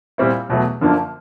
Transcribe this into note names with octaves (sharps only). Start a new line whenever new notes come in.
A#2 G3 C4 E4
E2 B2 F#3 A3
F#2 D3 F3 A#3 D4